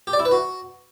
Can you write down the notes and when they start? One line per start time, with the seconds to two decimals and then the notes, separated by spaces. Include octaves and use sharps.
0.07 G4
0.13 D5
0.19 E4
0.25 B4
0.31 F#4